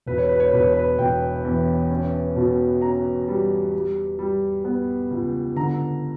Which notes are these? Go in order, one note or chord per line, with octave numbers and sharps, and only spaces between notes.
E1 B4
C#5
B4
C#5
E1 B4
C#5
B4
E1 G5
E2
C#4
B2
C#4 A#5
G3
G3
G3
B3
C#2
D3 A#5